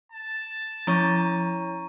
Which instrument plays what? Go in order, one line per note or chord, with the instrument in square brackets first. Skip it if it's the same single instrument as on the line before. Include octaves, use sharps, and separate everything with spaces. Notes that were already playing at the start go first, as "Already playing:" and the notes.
[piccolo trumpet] A5
[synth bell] F3 [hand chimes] C#4 E4 C#5 [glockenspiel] A#5 C#6 D#7